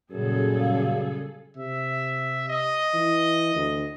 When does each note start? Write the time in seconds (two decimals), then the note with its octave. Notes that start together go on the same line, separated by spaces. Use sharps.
0.12 F#2 A#2 C#3 G3 G#4 A4
0.60 F5
1.57 C3 E5
2.49 D#5
2.94 E3
3.55 D2